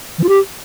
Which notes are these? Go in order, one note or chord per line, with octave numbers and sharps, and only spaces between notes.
E3
F4
G4